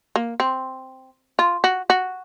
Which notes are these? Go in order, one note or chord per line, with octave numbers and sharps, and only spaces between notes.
A#3
C4
F4
F#4
F#4